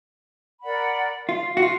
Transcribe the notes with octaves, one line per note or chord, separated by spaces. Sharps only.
A#4 D5 F#5 B5
F4
F#4
F4